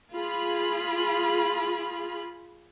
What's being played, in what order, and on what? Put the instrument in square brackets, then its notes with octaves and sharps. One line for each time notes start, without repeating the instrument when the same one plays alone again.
[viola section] F4 G#4 B5